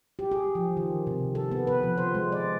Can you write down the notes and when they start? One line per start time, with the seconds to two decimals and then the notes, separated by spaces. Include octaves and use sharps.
0.19 G4
0.32 G#4
0.55 F3
0.77 D#3
1.07 C3
1.35 A4
1.51 B3
1.67 B4
1.83 F3
1.98 C5
2.15 G#3
2.32 D5